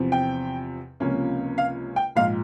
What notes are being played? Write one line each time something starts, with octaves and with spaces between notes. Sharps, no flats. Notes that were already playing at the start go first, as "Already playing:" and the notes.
Already playing: E2 C3 F3 C4
G5
C#2 C3 F3 A#3 C#4
F5
G5
A#1 G#2 F3 F5